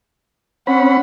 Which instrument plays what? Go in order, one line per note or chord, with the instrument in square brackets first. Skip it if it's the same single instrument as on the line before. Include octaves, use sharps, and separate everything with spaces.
[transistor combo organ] C4 C#4 B5 [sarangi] F#5